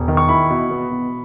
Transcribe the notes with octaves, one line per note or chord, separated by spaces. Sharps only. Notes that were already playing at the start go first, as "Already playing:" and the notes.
Already playing: E1
D#3
C#6
E4 B5
B2
B3
B2